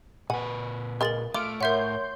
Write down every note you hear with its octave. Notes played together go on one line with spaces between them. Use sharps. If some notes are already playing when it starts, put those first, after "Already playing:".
A#2 B4 F#5 G#5
G#3 F4 A#4 A6 F#7
A3 F4 D6 F6 D7
A2 A#4 C#5 E5 F#5 C6 G6